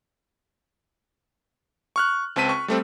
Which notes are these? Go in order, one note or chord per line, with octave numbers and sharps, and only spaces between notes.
C#6 F6 F#6
C#2 C4 A5 B6 D#7
C#6
G3 A3 C4